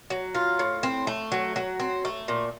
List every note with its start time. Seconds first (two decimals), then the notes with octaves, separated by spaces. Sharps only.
0.10 F#3
0.35 F4
0.59 A2
0.83 C4
1.07 A3
1.32 F#3
1.56 F#3
1.80 C4
2.05 A3
2.28 A#2